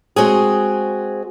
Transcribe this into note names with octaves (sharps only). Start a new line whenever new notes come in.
G#3 C4 F#4 G#4